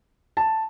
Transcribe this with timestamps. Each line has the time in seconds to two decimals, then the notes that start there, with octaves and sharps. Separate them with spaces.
0.37 A5